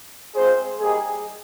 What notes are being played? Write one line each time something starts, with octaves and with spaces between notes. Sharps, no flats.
G#3 C4 F4 G#4 C5
G3 A#3 D#4 G4 G#4